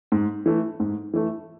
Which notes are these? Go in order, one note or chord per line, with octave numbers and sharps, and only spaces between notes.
G#2
E3 A3
G#2
E3 A3